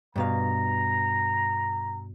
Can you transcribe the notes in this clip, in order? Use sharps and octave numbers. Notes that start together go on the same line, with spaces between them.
G2 B2 F5 A#5